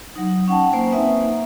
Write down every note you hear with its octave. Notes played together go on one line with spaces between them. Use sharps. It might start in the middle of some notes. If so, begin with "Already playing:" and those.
F#3 D#4
C#4 F#5 G5 A5
A#3 C5 G#5
C4 D#4 B4 E5
A#3